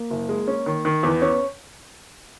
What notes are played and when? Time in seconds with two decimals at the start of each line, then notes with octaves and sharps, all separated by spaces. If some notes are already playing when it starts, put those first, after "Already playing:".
Already playing: A#3
0.10 F#1
0.29 G#3
0.48 C#4
0.66 D#3
0.85 D#3
1.03 E2 B3
1.22 C#4